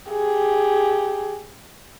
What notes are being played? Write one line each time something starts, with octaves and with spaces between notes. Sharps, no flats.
G4 G#4